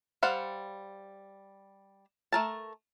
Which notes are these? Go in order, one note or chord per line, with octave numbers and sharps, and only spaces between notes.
G3 C5 F5 F#5
A3 A#4 A5